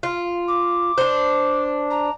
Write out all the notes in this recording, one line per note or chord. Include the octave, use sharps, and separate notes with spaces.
F4
D6
D4 C5
A#5